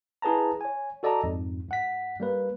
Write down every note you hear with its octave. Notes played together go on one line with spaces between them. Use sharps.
E4 G#4 B4 A5 A#5
C#5 G#5
F#4 A4 D5 D#5 A5 A#5
F2 G#2
G2 F#5 B6
G3 A#3 B4